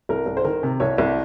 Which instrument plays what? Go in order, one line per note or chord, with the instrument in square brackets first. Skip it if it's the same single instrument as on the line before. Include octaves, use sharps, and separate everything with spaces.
[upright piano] C2 A#4
C2
C5
D#3 A#4
C3
C2 C#5
C2